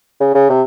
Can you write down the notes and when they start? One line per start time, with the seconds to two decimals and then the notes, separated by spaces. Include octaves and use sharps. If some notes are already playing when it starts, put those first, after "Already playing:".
0.20 C#3
0.35 C#3
0.49 C3